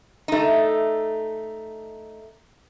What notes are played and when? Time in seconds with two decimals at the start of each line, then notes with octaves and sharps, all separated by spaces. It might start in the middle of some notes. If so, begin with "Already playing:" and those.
0.28 A3 D#4